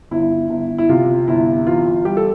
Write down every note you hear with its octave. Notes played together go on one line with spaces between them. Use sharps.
G1 E4
G1
E4
C3 F4
G1 E4
E3 F4
G3 G4
A4